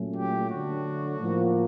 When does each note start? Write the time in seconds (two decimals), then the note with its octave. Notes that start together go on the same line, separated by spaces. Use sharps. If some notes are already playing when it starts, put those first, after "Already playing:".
Already playing: A#2 F#3 A3 C#4
0.15 G4
0.49 D3 F#3 A3 D4 F#4
1.20 A2 F3 A#3